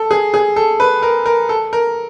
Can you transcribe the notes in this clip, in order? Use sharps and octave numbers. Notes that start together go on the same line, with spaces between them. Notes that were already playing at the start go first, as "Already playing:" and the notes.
Already playing: A4
G#4
G#4
A4
B4
A#4
A#4
A4
A#4